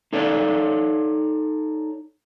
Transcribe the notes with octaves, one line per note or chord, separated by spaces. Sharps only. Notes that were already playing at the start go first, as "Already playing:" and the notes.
D#4 A4 C#5 D5